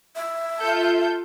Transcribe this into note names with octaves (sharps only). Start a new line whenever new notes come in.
E5
F4 A4 G6